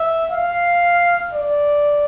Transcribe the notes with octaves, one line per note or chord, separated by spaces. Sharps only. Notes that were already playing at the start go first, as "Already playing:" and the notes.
Already playing: E5
F5
D5